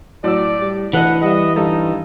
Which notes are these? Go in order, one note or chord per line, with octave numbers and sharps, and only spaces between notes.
A2 F#3 D5 E6
G3
D2 E3 A4 B4 D#5 F#5
G3 D#5 E5 F#5
G2 D3 G3 D#4 A4